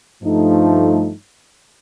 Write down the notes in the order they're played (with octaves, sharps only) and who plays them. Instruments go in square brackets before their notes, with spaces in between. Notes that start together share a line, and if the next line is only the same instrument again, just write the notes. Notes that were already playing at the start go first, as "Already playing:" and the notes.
[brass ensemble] G2 F3 A3 D#4